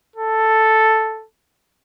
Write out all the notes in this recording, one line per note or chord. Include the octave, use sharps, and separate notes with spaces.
A4